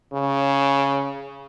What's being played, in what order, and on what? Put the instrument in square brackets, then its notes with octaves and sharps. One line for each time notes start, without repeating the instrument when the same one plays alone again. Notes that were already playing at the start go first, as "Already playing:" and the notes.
[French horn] C#3